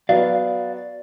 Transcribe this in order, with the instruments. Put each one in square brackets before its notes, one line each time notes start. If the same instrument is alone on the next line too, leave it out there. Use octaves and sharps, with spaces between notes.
[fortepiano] F#3 B3 [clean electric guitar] D5 F5